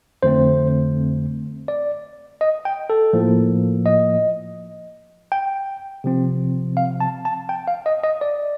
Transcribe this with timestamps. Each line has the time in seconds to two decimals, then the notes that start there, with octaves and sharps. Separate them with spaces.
0.23 F2 D3 A3 C4 C5
1.68 D5
2.41 D#5
2.65 G5
2.90 A4
3.13 A2 F3 A#3
3.86 D#5
5.32 G5
6.04 C3 F3 C4
6.77 F5
7.00 A5
7.25 A5
7.49 G5
7.68 F5
7.86 D#5
8.03 D#5
8.21 D5